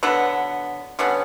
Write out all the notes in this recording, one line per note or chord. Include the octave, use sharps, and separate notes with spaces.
D3 F#3 B3
D3 G3 B3 C#4